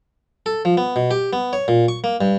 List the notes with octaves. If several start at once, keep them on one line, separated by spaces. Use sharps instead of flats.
A4
F3
B3
B2
G4
B3
C#5
A#2
C#6
A#3
G2